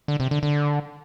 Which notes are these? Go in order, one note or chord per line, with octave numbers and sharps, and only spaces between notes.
D3
C3
D3
D3